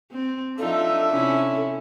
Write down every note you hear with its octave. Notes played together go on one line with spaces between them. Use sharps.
C4
F3 D4 D#4 F4 A4 E5
C3 C#4 E4